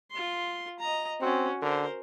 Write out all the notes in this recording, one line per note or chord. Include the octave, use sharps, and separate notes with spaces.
F4 C6
D#5 A#5
C4 C#4 F#4
D3 A#4 C5